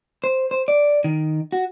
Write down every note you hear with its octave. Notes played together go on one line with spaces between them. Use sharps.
C5
C5
D5
D#3
F#4